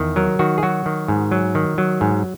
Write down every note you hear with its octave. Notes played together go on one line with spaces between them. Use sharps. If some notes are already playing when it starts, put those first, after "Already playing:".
Already playing: E2 D#3
F#3 A#4
D#3 F#4
G#4
F#3 F#4
D#3
G#2
F#3
D#3
F#3
G#2